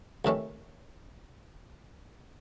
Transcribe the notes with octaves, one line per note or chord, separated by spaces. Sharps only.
C#2 C3 D#3 A3 C#4